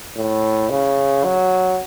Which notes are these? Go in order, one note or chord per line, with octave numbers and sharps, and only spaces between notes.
A2
C#3
F#3